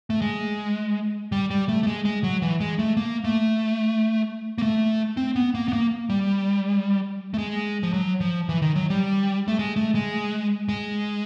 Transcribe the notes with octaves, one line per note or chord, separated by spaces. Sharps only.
A3
G#3
G3
G3
A3
A3
G#3
G#3
F#3
E3
G#3
A3
A#3
A3
A#3
A3
C4
B3
A#3
B3
A#3
G3
A3
G#3
F3
F#3
F3
E3
D#3
F#3
G3
A3
G#3
A3
G#3
G#3